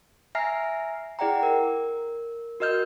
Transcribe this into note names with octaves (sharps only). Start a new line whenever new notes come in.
E5 G#5 A#5 F6 A#6 C7
E4 G#4 D5 F#5 G5 A#5
A#4
F#4 A#4 D#5 F6 G6